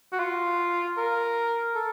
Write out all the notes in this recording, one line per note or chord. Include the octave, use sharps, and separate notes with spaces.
F#4
F4
A#4
A4